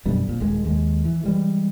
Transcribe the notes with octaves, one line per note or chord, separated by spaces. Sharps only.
F#2 B2 D3 G3
A#1 F2 A#2
D#1 G#1 D#3 G#3
D#2 G#3
E3
E3 G3 G#3